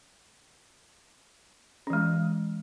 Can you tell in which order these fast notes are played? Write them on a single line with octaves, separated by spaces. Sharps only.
C#4 E3 G#3